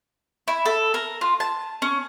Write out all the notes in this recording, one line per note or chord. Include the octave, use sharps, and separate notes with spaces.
E4
A4
A#4
F4
A5
C#4